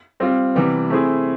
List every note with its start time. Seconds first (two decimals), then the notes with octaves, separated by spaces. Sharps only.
0.20 G3 C4 F4
0.55 C3 E3 G3 B3
0.90 A3 C4 E4 G#4